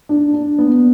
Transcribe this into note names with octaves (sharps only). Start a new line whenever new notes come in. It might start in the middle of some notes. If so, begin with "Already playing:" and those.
D4
D4
B3